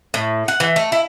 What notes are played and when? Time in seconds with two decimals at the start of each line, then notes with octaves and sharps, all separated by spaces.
0.14 A2
0.48 F#5
0.60 E3
0.76 A3
0.92 E4